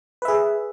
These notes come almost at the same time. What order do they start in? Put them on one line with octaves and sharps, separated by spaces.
B4 E5 G#4